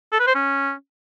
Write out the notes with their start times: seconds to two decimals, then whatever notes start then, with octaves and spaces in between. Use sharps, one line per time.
0.12 A4
0.20 B4
0.27 C5
0.35 C#4